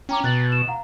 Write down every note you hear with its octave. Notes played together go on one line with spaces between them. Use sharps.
C#4 G5 A#5 D6
B2 F#6 A6 F#7
E7
F5 F#5 A#5